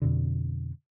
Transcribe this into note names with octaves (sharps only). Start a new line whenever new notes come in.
F2 B2 D3